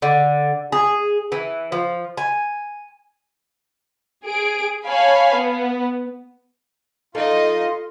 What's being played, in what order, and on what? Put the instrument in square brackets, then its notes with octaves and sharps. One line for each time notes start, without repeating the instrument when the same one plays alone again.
[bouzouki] D3
G#4
E3
F3
G#5
[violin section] G#4 D7
C#5 F5 G#5 A5 B5
B3
[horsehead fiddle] D#4 D#5 [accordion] F4 C6 [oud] A4